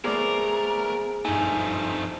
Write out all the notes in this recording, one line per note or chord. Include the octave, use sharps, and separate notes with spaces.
A3 B3 G#4 A#4 C5 D5
G2 F3 A3 D#4 G#5